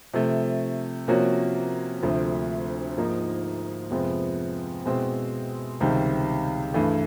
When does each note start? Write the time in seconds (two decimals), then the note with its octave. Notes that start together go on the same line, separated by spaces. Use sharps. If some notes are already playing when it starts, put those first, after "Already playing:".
0.14 C3 F3 A3
1.08 C3 F3 A#3 C#4 F#4
2.03 D2 C3 F3 A3
2.97 G#2 F3 A#3 D#4
3.91 F2 C3 F3 G#3 B3
4.86 B2 G#3 C4 E4
5.80 C#2 C3 D#3 G3
6.74 G2 E3 A3